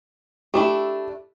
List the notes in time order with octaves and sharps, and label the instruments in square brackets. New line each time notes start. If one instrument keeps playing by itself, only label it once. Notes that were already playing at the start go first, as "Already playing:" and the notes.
[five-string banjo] A3 D4 E4 [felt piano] G4